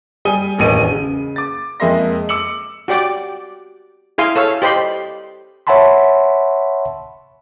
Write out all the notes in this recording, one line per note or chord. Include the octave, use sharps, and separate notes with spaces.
G3 G#5 D#6 D#7 G7
E1 A1 D#3 D#7
C#3
D6 A6
F2 G#3 A#3 E5 C6 A#6
D6 E6 C#7 F#7
F#4 G4 D5 G5 D6
E4 G#4 F5 G#5 C6
A4 C#5 F5 E6
G4 C5 D#5 B5 C6
C#5 E5 F#5 A5 B5 C6